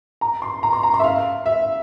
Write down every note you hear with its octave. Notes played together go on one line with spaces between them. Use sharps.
A#5
C6
A#5
C6
A#5
C6
E5
F5
E5